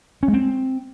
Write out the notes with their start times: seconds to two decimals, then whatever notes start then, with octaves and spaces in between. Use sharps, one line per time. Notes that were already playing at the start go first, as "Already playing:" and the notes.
0.23 C#4
0.28 G#3
0.33 C4